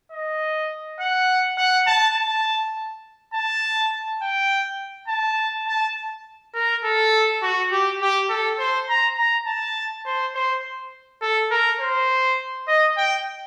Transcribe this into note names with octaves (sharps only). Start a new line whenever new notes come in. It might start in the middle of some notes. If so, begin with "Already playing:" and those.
D#5
F#5
F#5
A5
A5
A5
G5
A5
A5
A#4
A4
F#4
G4
G4
A4
C5
A#5
A#5
A5
C5
C5
A4
A#4
C5
D#5
G5